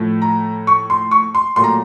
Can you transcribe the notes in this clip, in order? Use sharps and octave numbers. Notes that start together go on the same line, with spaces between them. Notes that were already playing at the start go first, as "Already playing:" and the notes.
Already playing: A2 F3 A3
A#5
C#6
C6
C#6
C6
A#2 F#3 A3 C6
A#5